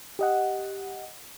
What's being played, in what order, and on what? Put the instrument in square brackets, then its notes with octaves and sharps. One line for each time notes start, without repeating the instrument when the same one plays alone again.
[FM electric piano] G4 D#5 F#5